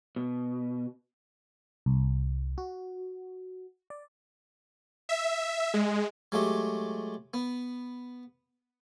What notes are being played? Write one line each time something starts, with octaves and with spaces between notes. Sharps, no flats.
B2
C2
F#4
D5
E5
G#3
F#3 G#3 A3 G4
B3